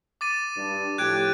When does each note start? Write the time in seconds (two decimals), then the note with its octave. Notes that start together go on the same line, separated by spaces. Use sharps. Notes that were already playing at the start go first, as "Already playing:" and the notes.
0.21 D6 A6 D#7
0.56 G2
0.98 A2 F3 G4 F#6 G#6 D7